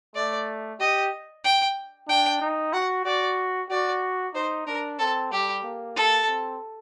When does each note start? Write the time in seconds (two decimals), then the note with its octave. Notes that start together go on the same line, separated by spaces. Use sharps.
0.15 A3 D5
0.80 G4 D#5
1.44 G5
2.08 D4 G5
2.42 D#4
2.73 F#4 F#5
3.05 F#4 D5
3.70 F#4 D5
4.35 D#4 C5
4.67 D4 A#4
4.99 C4 A4
5.32 G3 G4
5.63 A#3
5.96 A4
6.28 C4